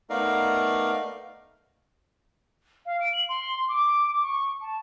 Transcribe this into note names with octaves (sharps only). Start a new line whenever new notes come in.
A3 B3 D#4 A#4 D5 F5
F5
D7
F#7
C6
D6
C#6
A5